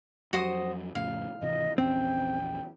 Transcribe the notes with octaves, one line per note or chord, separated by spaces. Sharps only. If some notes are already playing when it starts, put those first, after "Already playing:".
F2 F#3 F#4 C5 D#6
F2 A2 C#3 F5
G#1 C3 E3 D#5
A#1 E2 C4 C#4 G5